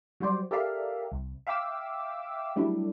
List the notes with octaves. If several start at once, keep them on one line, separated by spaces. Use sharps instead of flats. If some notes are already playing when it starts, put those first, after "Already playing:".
F#3 G3 F#4 C5 D5
G4 A4 A#4 D5 E5 F5
C2
E5 F5 G5 D6 E6
F#3 G3 A3 D4 E4